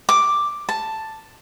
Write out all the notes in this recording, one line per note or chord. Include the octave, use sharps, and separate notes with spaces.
D6
A5